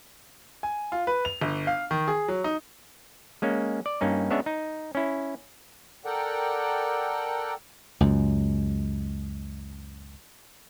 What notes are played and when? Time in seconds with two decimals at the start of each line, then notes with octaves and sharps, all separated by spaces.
0.63 G#5
0.92 F4
1.07 B4
1.25 F7
1.41 G1
1.67 F5
1.91 D#3
2.08 G#4
2.28 F#3
2.44 D#4
3.42 G#3 A#3 C#4
3.86 D5
4.01 G2 A#3 C#4 D#4
4.30 G#3 B3 C#4 D4 C#5 E5
4.46 D#4
4.95 C#4 E4
6.05 A4 A#4 D5 F#5 G5
8.01 C#2 F#2